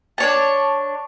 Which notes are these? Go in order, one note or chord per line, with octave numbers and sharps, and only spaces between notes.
D4 C#5 A5